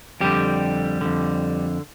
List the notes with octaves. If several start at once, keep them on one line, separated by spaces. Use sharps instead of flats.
F2 D3 G3 G4
F2 D3